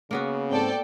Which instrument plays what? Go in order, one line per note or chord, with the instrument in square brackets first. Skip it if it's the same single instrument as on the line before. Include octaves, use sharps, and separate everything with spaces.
[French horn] C#3 [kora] A#3 B3 F#4
[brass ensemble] G#2 C4 [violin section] A4 D5 G5